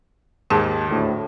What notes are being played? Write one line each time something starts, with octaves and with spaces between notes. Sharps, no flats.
D#2 G#2 G#4 A5
D2 A2